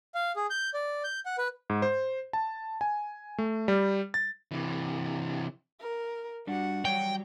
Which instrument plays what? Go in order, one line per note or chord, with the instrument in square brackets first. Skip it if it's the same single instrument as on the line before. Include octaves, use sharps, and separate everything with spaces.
[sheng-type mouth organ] F5
G#4
G6
D5
G6
F#5
B4
[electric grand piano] G#2
C5
A5
G#5
A3
G3
A6
[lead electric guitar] C3 E3
[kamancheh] A#4
[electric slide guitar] G3 D4 [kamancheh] F#4 F#5
[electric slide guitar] F#3 G3 C#5 [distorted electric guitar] G5